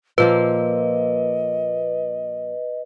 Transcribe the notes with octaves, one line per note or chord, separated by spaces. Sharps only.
A#2 F3 A#3 B4 D#5